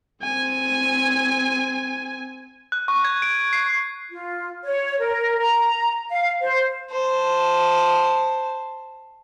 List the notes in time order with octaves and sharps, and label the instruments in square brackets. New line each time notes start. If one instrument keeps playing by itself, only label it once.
[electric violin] C4 G#5
[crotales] F#6
C#6
G#6
D7
C7
[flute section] F4
C#5
A#4
A#5
F5
C5
[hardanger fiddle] C5 A5